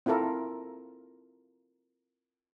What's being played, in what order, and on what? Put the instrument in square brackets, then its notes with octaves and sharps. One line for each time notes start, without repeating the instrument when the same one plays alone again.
[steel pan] C4 E4 F4 A4 A#4